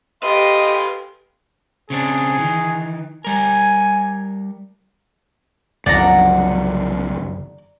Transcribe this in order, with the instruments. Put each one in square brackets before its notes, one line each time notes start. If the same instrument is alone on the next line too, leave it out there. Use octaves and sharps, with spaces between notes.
[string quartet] G4 D#6 [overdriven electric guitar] A4 B4 [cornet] D#5 [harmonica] F5 C6
[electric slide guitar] C#3 C4 D4 [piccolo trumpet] G#4
[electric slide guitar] D#3 E3
[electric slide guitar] G3 A#4 [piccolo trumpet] G#5
[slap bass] F#1 D#3 [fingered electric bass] C2 F#2 F3 [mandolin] D5 F#5 A#5